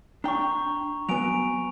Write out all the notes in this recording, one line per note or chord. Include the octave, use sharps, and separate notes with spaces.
D4 G5 A#5 C#6
F#3 B3 G#5 D7 F7